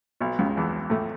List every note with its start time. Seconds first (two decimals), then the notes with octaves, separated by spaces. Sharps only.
0.21 B1 B2
0.39 C#2 C#3
0.57 E2 E3
0.90 A2 A3